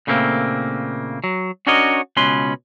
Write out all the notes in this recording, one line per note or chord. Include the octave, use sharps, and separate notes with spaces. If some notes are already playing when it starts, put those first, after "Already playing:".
A#2 C#3 A3 A#3 C4
F#3
C#4 D4 F#4 A#4 C#5 D#5
C#2 B2 C#4 B4 C6